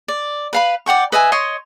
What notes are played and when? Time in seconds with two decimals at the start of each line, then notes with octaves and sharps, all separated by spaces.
0.08 D5
0.53 B4 F5 B5
0.86 D5 F#5 G5 C#6
1.12 B4 D#5 E5 G#5
1.32 C#5 D#5 C6 C#6